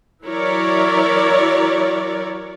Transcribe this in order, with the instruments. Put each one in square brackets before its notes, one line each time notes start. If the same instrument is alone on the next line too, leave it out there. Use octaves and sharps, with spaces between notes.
[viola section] E3 F#3 E4 A#4 C#5 D5